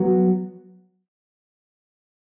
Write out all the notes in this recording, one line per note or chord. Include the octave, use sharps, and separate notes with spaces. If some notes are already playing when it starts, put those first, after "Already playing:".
Already playing: F#3 B3 F#4